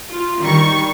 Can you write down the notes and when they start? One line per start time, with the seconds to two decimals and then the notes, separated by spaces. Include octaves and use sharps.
0.11 F4
0.41 D#3 G3 C#6